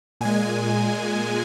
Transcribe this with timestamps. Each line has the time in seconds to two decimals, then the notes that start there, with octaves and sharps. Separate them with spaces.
0.21 A#2 G#3 G#5